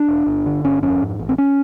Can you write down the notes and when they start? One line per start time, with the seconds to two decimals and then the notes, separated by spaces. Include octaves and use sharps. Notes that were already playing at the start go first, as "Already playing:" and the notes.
Already playing: D4
0.08 E1
0.27 G1
0.46 D3
0.64 G1 C#4
0.82 F2 C#4
1.01 G#2
1.19 A1
1.29 C4
1.38 C#4